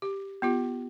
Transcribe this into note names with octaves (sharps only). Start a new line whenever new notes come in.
G4
B3 F4 G4